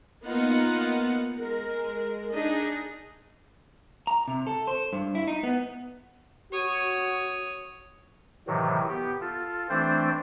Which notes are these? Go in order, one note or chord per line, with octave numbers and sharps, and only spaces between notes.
A#3 B3 D#4 F4 D#5 F#5
G#3 A#4
D4 D#4 G#4 D#5
A#5
C3
A4
C5
G2
E4
D#4
B3
F#4 C#5 D#6
A2 C3 D#3 E3 F#3
B3 G4
F4 A4
E3 A3 C4 D4 C5 D5